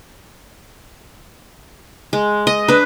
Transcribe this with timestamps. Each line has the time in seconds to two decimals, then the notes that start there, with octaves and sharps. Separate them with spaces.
2.13 G#3
2.47 D#5
2.68 D4 B4